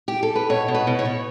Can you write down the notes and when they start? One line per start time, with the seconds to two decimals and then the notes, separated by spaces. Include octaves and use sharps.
0.08 G4
0.23 A4
0.35 B4
0.50 B2 C#5
0.68 B2
0.74 B4
0.87 B2
0.99 C#5
1.05 B2